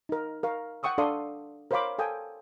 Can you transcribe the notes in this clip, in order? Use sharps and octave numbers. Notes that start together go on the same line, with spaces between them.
D#4 A#4
A#4 F5 C#6
F#5 G5 C#6 D#6 E6
D4 A4 D5 F5 C6 D#6
A#4 C5 C#5 F5 B5 D6
A4 F5 G5 G#5 D#6